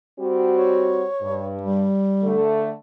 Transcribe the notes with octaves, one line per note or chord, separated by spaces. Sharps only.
G3 C4 F#4
C#5
G2
G3
D3 A3